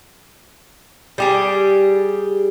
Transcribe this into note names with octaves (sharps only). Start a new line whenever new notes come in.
G3 G4 G#4